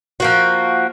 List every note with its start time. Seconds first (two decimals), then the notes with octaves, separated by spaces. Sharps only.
0.20 F3 A#3 F#4